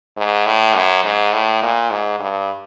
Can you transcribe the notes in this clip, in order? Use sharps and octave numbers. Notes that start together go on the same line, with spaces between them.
G#2
A2
F#2
G#2
A2
A#2
G#2
G2